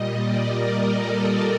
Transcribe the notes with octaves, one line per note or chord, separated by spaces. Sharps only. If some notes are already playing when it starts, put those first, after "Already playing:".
Already playing: A#2 G3 D#5
D5
A#4
A4